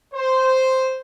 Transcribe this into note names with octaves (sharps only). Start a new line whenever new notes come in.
C5